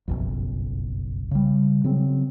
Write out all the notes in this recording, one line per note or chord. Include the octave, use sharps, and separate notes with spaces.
F#1 B1 F2
C#3 G3
C#3 F#3 C4